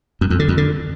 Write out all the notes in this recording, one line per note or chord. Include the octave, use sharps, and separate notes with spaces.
F#2
F2
D3
F2
D3